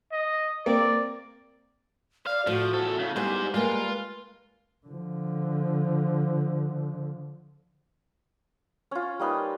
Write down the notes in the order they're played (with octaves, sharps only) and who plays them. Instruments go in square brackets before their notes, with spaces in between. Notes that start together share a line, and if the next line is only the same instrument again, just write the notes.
[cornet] D#5
[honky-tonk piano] A#3 C4 [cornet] D5
[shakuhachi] D5 [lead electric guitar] F5
[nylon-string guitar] A2 [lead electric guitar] F3 [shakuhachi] F#4
[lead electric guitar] E2 A4
C#3
[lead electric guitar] G#2 C5 [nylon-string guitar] G3 G#3 B3 [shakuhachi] G4
[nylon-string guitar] G3 G#3 A#3 [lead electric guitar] F4 [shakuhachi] B4
[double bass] D3 F3
[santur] C#4 F4
G3 A#3 D#4 B4